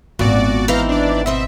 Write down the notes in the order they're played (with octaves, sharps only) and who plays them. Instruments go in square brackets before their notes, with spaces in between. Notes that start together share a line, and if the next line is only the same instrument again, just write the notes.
[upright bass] G#1 B3 [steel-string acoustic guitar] A#2 [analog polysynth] F#4 D5
[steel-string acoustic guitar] E3 C4 D#4 [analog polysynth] F5 A#5
[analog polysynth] D4 D5
[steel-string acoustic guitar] B2 C4 D#5 [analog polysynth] E5